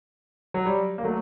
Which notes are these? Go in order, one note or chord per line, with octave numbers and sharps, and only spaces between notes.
F#3
G3
A#3
F#3 A3